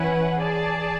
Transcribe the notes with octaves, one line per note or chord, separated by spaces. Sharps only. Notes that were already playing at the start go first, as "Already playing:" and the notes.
Already playing: E3 C#4 E4 B4 F#5
G#4 D5 A5